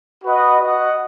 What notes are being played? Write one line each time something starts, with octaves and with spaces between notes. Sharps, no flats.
F#4 B4 D#5 F#5
F#4 D#5 F#5